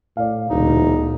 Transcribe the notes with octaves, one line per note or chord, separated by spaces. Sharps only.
A2 D5 F5
E1 D2 A#2 D#4